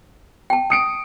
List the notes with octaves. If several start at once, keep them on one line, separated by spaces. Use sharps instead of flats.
G5 A5
D#6 C#7 D7